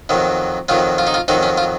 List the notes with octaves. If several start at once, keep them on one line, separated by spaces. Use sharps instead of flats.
F2 D#3 F#3
F2 D#3 F#3 F4
F4
D#4
F4
F2 D#3 F#3 D#4
C#4
F4